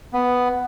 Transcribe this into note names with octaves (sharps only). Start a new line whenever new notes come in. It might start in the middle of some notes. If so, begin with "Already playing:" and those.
B3